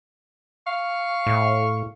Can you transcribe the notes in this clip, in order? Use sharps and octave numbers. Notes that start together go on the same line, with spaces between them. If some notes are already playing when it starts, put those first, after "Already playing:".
F5 C#6
A2